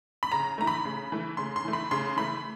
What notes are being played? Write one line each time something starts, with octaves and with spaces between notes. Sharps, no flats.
B5
C#3 A#5
E3 A3 A#5
B5
C#3
E3 A3
C#3 C6
C6
E3 A3
B5
C#3 C6
E3 A3 B5